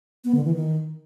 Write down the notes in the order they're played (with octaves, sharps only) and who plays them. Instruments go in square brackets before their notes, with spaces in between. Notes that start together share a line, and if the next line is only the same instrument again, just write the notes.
[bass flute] B3
D3
E3
D#3